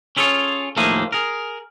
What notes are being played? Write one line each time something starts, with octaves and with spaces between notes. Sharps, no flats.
C#4 E4 F4 G#4 A4 C#5
D#2 A2 F3 A3 A#3 G#4
G#4 A#4